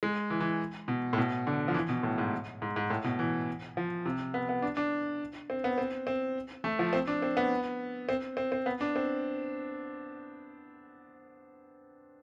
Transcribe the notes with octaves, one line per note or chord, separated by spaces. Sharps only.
G#3
E3
E3
B2
A2
B2
D3
F3
E3
B2
A2
G#2
G#2
G#2
A2
B2
E3
F3
C3
B3
B3
D4
D4
C4
B3
C4
C4
A3
F3
C4
D4
C4
B3
C4
C4
C4
B3
D4
C4